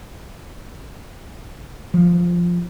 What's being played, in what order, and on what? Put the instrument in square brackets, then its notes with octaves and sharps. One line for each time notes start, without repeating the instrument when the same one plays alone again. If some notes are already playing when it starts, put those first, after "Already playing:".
[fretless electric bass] F3